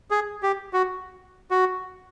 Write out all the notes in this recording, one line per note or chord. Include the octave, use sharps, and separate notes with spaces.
G#4
G4
F#4
F#4